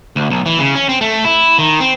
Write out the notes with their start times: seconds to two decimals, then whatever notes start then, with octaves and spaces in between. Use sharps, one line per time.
0.16 D2
0.30 B1
0.46 E3
0.60 C#3
0.75 C#4
0.89 C4
1.01 A3
1.24 E4
1.58 D#3
1.80 C4